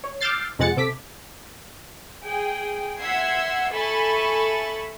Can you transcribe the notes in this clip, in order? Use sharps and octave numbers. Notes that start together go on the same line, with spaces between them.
C#5
D6 E6 F6 G6 A6 C7
F2 C3 G#3 F#5 A6 C#7
C3 A4 D6 B6
G#4 G5
E5 F#5 C6 E6 G#6 C7
A4 E5 G#5 B5 C#6 A6